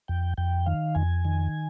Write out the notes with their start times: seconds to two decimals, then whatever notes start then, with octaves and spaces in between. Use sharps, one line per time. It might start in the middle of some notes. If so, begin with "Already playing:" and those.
0.08 F2 G5
0.38 F2 G5
0.66 D#3 F5
0.95 F2 G#5
1.25 D#3